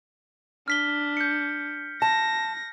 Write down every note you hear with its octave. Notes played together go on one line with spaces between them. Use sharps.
D4 F6 B6 G7
G6 C#7
A5 A#6